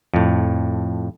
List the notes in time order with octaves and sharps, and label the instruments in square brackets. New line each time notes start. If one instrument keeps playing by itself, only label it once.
[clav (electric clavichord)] F2 A2